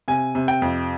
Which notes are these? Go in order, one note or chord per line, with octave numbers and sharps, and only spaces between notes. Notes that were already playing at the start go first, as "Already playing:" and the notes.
C3 G#5
C3
G5
F2